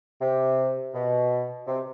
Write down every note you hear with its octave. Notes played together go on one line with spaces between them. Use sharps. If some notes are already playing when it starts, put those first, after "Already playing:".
C3
B2
C3